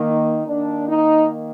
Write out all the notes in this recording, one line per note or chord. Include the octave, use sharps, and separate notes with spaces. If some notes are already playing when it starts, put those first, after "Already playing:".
Already playing: D#3 A#3
D#4
D#3 A#3 D4
D#4